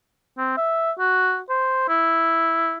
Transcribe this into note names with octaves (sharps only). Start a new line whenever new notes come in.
C4
E5
F#4
C5
E4